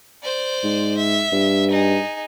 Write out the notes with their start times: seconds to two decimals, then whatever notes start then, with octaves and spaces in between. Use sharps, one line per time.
0.23 C5 D5
0.64 G#2
0.97 E5
1.32 G2
1.71 D#4 G#4